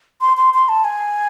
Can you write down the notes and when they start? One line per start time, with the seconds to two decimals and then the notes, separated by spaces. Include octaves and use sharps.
0.21 C6
0.37 C6
0.54 C6
0.68 A5
0.84 G#5